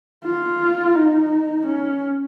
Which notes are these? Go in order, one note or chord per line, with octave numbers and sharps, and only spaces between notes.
F4
D#4
C#4